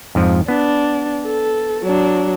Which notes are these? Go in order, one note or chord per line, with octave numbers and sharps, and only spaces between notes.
F2 G#2 F3
B3 D4
A4
F#3 D4